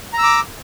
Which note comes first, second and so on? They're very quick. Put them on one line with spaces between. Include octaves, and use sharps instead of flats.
A#5 E6 D6